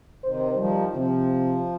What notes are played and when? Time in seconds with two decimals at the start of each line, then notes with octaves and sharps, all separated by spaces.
0.23 C3 D#3 C5
0.56 D#3 F3 G3
0.95 C3 F3